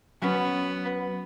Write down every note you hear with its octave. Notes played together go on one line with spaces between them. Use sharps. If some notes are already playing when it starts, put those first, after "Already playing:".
F#3 B3 C#4